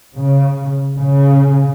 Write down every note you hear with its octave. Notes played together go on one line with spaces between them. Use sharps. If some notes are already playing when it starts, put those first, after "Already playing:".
C#3
C#3